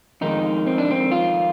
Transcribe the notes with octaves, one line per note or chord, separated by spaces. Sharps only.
F2 D#3 G#3 D#4
C4
D4
C4
F4